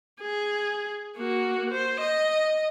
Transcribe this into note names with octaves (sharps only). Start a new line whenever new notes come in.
G#4
A#3 F#4
C5
D#5